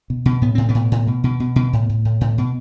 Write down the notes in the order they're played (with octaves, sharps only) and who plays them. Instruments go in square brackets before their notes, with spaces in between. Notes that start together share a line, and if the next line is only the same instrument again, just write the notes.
[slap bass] B2
B2
A2 B3
A2 C4
B2 B3
A2
A2
B2
B2
B2
B2
A2
A2
A2
A2
B2